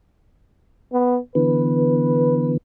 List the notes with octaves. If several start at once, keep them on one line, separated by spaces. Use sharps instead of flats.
B3
D3 E3 B3 B4